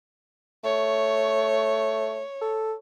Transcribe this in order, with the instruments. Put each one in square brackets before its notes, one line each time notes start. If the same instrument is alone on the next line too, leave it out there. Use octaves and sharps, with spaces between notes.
[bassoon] A3 [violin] C#5
[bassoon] A4